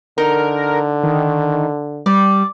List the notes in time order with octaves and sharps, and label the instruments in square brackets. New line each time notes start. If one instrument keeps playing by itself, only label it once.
[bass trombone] D3 [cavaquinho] D#4 [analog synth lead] A#4
[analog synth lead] D#3
[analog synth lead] G3 [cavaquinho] D5